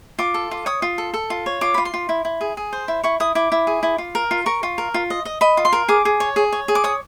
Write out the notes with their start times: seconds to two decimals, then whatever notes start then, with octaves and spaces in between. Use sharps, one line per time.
0.19 F4 D6
0.34 A4
0.51 F4
0.66 C#5 D#6
0.82 F4
0.98 A4
1.14 A4
1.30 F4
1.46 C#5
1.61 F4 D6
1.74 F4 B5
1.85 C6
1.94 F4
2.09 E4
2.25 E4
2.41 G#4
2.57 G#4
2.73 C5
2.88 E4
3.04 E4 C#6
3.20 E4 D#6
3.35 E4 D6
3.52 E4
3.67 G#4
3.83 E4
3.98 F4
4.15 A#4
4.31 F4
4.46 A#4 C#6
4.63 F4
4.78 A#4
4.94 F4
5.10 D#5
5.25 D#5
5.41 D#5 B5
5.57 F4
5.65 C6
5.73 A#4
5.89 G#4 D6
6.05 G#4
6.20 C#5
6.36 G#4
6.52 C#5
6.68 G#4
6.75 D6
6.84 C#5 D#6